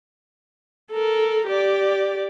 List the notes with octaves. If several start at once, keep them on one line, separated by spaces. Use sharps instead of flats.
A4 A#4
G4 D5